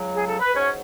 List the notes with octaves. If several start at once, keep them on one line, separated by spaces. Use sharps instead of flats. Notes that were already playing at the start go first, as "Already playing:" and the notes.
Already playing: C#2 C#3 F#3
G#4
A4
B4
G#2 F#3 C#4 C#5